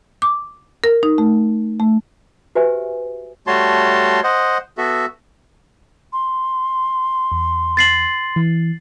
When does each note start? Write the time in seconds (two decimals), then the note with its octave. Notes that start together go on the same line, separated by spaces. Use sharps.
0.22 D6
0.84 A#4
1.03 D#4
1.18 A3
1.80 A3
2.55 F#4 G4 B4 C5 E5 G#5
3.47 G3 A3 F#4 C#5 A5 C6
4.24 C5 D#5 F#5
4.78 B3 F#4 A4 E5
6.12 C6
7.32 E2
7.77 A6 C7 F#7
8.36 E3